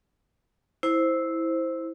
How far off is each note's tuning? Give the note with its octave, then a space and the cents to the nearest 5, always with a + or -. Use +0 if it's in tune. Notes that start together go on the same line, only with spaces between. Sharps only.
E4 -10 C5 +0